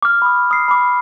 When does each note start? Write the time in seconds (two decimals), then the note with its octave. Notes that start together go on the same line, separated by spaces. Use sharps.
0.02 D6 F6
0.22 B5 D#6
0.51 D#6 C7
0.68 B5 D6